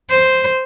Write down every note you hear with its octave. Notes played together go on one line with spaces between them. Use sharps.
C5